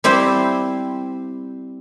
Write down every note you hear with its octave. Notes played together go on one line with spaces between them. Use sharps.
G3 C4 E4 G4 C5